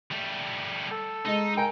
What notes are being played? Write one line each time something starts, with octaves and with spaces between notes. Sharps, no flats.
G3 A3
A4
G#3 D#4 D#5
A#4 G5 G#5 A#5